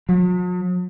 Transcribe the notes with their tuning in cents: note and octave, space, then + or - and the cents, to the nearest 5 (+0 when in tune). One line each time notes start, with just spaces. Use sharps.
F#3 -45